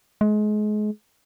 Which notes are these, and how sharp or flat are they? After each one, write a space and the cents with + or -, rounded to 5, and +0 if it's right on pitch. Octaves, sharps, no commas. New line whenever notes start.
G#3 +30